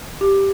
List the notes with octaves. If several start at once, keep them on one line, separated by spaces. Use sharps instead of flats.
G4